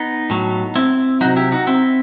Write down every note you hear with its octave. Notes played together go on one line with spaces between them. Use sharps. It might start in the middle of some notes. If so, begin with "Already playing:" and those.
Already playing: B3 D#4
A2 F#3
C4 E4
C3 F#3 D#4 F#4
E4 G4
D#4 F#4
C4 E4